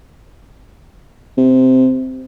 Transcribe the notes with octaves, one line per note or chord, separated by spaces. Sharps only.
C3